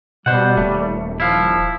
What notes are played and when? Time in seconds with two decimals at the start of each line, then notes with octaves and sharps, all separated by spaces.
0.26 B2 G3 C5 F#5
0.57 D#1 A3
1.20 F3 E4 F5